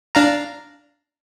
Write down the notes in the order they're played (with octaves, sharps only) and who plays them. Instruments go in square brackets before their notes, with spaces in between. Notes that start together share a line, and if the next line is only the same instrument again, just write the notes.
[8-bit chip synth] D4 F5 A#5